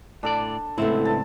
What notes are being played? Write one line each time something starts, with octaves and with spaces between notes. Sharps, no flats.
A2 D4 A4 D5
C#2 A2 A3 B3 C4 E4
A5